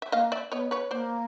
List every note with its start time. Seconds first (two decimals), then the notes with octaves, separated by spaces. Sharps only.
0.02 E5
0.12 A#3 D#5 F5
0.32 D5 E5
0.52 B3 C#5 D#5
0.71 B4 C#5
0.91 A#3 C5 D5